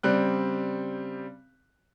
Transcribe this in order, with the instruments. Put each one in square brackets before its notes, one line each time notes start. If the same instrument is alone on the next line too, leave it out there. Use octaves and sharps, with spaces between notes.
[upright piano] C#3 G3 C4 F#6